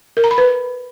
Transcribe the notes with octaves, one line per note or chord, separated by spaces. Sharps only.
A#4
A#5
B5
B4